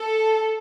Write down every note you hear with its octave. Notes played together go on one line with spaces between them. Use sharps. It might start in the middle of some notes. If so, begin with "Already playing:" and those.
Already playing: A4